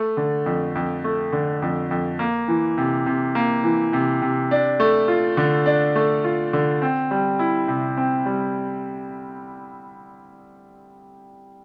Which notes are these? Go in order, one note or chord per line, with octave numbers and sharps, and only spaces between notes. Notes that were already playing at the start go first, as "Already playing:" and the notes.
Already playing: A3
D3
F2
F2
A3
D3
F2
F2
A#3
E3
C3
C3
A#3
E3
C3
C3
D4
A3
F4
D3
D4
A3
F4
D3
C4
G3
E4
C3
C4
G3